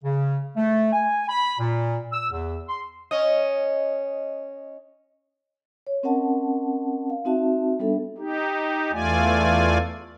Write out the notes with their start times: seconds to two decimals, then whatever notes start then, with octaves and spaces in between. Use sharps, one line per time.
0.04 C#3
0.57 A3
0.93 G#5
1.29 B5
1.59 A#2
2.13 E6
2.31 E2
2.69 C6
3.11 C#4 D#5
5.87 C#5
6.03 C4 C#4 A#4 D#5 F#5 A5
7.10 F5
7.25 C4 D#4 F#4 E5 A5
7.79 G3 B3 D4 A4 E5
8.18 D#4 G4
8.92 E2 A3 F4 D5 G#5